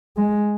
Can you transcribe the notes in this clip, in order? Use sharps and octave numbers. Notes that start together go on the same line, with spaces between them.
G#3